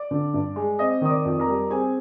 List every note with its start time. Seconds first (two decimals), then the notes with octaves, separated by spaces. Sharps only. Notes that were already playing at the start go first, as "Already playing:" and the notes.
Already playing: D5 D6
0.11 D3
0.34 G2
0.56 G#3
0.79 C4 D#5 D#6
1.01 D#3 D#6
1.10 D5 D6
1.25 F2
1.40 A#4 A#5
1.48 G3
1.70 C4 G#4 G#5